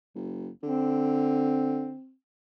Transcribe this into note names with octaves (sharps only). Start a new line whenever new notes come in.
F#1
D3 C4